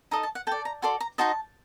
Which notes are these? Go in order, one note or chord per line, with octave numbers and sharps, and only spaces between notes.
D#4 A4 D#5 A#5
A5
F#5
A4 D5 G5
A#5
F#4 A4 D5 C6
A#5
D#4 F#4 C5 D#5 A5